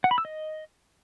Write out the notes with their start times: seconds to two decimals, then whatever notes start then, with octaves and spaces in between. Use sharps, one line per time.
0.04 F#5
0.11 B5
0.18 E6
0.25 D#5